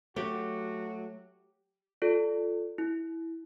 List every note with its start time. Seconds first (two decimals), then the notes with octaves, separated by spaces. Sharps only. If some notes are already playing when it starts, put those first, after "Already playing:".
0.16 F#3 A3 F#4 G4
2.02 F4 A4 D5
2.78 E4